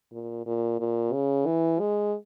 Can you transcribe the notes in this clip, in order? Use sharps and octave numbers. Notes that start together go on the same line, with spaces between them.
A#2
A#2
A#2
C#3
E3
G#3